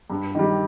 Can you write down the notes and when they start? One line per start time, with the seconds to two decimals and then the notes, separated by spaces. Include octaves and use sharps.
0.10 G2
0.35 D#3 G3